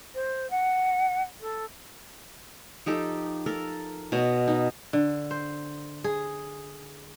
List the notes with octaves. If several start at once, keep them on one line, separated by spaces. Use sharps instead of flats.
C5
F#5
A4
F3 D#4 G4 A4
A4 A#4
B2 C#5 D#5
D#4
D3
C5
G#4